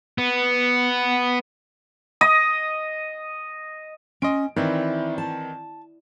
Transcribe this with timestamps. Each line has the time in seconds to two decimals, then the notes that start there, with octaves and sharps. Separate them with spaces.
0.18 B3
2.21 D#5 D#6
4.22 C#4 D#5 C6 D7
4.56 D#3 E3 C4 E4 D5
5.18 A5